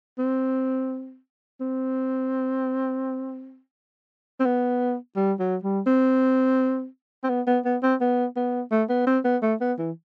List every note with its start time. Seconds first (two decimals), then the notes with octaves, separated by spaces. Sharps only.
0.18 C4
1.60 C4
4.40 C4
4.45 B3
5.16 G3
5.40 F#3
5.64 G3
5.87 C4
7.24 C4
7.29 B3
7.47 B3
7.65 B3
7.83 C4
8.01 B3
8.36 B3
8.72 A3
8.89 B3
9.07 C4
9.24 B3
9.42 A3
9.61 B3
9.78 E3